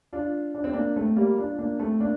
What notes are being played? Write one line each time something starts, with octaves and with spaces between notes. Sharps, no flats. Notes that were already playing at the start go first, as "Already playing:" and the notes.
D4 F4
D4
C4
A#3 D4
A3 C4
G3 A#3
D4 F4
A#3 D4
A3 C4
A#3 D4